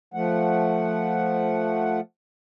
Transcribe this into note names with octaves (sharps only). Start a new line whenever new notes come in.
F3 A3 F#5